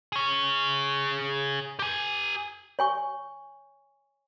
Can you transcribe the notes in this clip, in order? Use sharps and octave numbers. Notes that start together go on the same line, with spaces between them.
G#4 C#5
G4 G#5
C#5 G#5 C#6